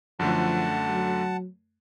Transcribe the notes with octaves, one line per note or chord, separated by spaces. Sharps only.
F#2 D3 F3 A3 F#5 A5
F#3